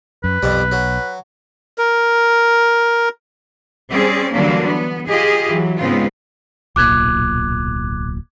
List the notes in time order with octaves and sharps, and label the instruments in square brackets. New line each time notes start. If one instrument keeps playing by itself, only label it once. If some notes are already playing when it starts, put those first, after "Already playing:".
[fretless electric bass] F#2 [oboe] B4
[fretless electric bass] B1 [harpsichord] F2 G3
[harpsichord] F#3
[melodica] A#4
[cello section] G3 C4 C#4 G#4 D5
D3 E3 F#3 G3 A#3 D4
B3
F4 G4 G#4 D#5
E3 F#3
G#2 C#3 G#3 B3 C4 F4
[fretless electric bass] D1 B1 A#2 [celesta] D6 F#6 G#6